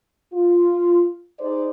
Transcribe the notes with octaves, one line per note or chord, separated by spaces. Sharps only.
F4
D#4 G#4 C5 D5